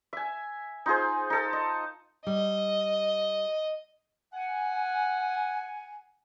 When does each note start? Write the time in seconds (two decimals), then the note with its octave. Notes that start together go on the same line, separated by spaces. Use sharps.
0.13 E5 G#5
0.86 D#4 F4 G#4 C5
1.30 D#4 A4
1.53 D#5
2.27 G3 D#5
4.34 F#5 G#5